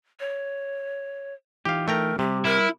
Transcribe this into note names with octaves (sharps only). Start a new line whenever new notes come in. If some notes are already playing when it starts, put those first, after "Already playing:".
C#5
E3 D#4 F4 G4 F5
A3 A#4 G5 A#5
C3 G3 G4
E4 A#4